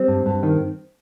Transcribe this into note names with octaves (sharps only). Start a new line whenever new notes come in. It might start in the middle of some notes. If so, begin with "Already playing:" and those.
Already playing: G3 C4
G2
G2
D#3